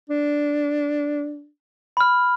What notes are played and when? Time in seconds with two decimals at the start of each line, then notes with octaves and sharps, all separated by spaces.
0.09 D4
1.97 B5 F6